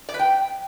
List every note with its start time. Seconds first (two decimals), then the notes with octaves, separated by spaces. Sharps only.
0.09 D5
0.14 B4
0.19 G5